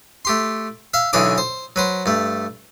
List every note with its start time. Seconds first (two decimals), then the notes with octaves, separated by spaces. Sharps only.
0.25 A3 G4 C6
0.94 E5 F5
1.13 B1 D3 E3 G#4 C#5 D6
1.38 C5
1.76 F#3 B4 C5
2.06 G2 A3